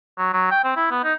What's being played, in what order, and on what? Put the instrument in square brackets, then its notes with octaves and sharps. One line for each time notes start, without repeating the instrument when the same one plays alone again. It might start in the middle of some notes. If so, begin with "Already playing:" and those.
[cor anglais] F#3
F#3
G5
C4
E4
B3
D#4